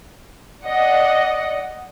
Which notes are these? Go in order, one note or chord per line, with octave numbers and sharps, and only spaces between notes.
D5 D#5 F#5